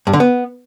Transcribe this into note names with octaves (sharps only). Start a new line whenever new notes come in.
G2
D3
B3